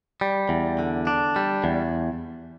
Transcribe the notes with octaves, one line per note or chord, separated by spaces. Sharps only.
G3
E2
D3
D4
G3
E2